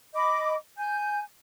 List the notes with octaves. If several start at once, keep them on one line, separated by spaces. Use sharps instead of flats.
D#5 B5 D6
G#5 G6